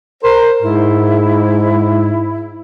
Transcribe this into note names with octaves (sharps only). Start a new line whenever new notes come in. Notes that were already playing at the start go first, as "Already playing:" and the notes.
A#4 C5
G#2 E4